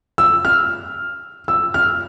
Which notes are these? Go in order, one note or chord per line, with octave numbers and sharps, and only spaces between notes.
E6
F6
E6
F6